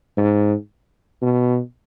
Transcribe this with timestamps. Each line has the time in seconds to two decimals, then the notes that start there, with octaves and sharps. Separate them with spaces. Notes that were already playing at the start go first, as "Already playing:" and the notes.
0.17 G#2
1.22 B2